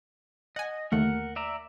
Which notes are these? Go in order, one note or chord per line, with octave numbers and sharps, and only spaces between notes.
D#5 F#5 G#5
D#2 D3 A3 A#4 F#5
D5 E5 A#5